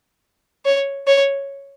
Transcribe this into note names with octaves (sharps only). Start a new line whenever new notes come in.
C#5
C#5